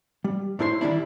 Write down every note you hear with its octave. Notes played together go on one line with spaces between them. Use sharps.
G3
A2 A3 E4 C5 G#5 C6
D#3 E3 G3 C#4 D4 E4